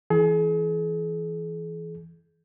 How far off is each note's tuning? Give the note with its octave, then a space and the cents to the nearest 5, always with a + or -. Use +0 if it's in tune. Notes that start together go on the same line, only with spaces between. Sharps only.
E3 +0 G#4 +40